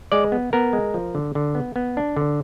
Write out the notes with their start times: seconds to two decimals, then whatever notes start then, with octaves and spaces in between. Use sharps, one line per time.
0.12 G#3 D5
0.32 B3
0.53 B3 A#4
0.73 G#3
0.94 F3
1.15 D3
1.35 D3
1.55 B3
1.76 B3
1.97 D4
2.17 D3